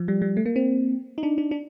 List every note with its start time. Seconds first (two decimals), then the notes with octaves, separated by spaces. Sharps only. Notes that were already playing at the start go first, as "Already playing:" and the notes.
Already playing: F3
0.08 G3
0.22 G3
0.37 A3
0.46 A#3
0.56 C4
1.18 D#4
1.23 D4
1.38 D4
1.51 D4